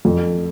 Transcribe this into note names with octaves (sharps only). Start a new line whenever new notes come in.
F2